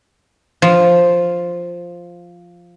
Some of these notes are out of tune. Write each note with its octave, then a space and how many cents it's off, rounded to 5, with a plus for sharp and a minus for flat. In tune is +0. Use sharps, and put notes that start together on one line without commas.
F3 +0